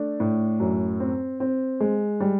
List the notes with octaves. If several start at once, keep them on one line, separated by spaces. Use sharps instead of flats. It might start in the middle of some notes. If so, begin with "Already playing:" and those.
Already playing: A3 D4
A2
F#2
C4
C4
G#3
G3